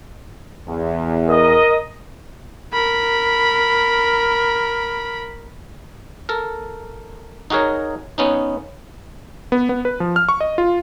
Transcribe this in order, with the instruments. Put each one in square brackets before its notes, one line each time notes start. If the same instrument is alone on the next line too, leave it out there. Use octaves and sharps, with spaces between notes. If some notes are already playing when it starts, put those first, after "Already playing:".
[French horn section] E2
[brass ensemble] A#4 D#5
[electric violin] A#4 B5
[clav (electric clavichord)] A4 A#4
D#4 F#4 G#4 A#4 C#5
B3 C#4 D#4
[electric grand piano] B3
B3
B4
F3
F6
C#6
D#5
F4